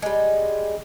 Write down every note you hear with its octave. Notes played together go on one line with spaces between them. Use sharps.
G3 G#3